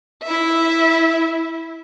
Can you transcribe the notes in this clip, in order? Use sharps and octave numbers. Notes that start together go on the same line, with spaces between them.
E4 E5